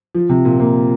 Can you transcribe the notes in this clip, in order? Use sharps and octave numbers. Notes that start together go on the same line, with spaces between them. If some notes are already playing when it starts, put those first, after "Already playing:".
F3
C3
A#2
A#3